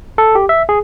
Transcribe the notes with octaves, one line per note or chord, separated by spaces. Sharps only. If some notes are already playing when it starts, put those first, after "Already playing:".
A4
G4
E5
G#4